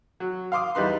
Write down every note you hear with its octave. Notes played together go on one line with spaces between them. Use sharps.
F#3
F5 C6 D6 D#6
E2 G3 D#4 B4 C6